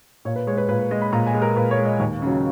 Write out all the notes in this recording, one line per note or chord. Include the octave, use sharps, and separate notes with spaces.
A#2 C#5
B4
G#3 C#5
B4
A#2 B4
B4
G#3 D#5
B5
A#2 A#5
G#5
G#3
A#4
A#2 B4
C#5
G#3
D#5
D#2
C#3 F#3